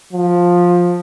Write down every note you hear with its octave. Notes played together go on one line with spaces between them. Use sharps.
F3